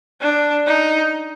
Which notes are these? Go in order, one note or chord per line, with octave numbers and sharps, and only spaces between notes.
D4
D#4